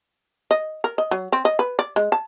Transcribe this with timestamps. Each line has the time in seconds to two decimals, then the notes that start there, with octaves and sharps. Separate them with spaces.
0.51 D#5
0.84 A#4
0.98 D#5
1.11 F#3
1.32 C4
1.45 D#5
1.59 B4
1.79 D5
1.96 G#3
2.12 A5